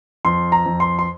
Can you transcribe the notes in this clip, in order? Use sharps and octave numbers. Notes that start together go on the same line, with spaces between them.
F2 C6
A#5
F2
C6
C6